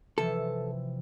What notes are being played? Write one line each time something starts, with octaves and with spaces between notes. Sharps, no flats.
C3 E3 F3 A4